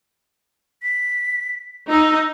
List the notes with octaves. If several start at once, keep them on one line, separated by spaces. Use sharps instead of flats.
B6
D#4 E6